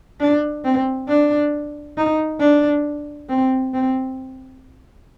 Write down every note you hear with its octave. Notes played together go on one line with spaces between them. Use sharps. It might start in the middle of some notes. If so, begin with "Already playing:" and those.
D4
C4
D4
D#4
D4
C4
C4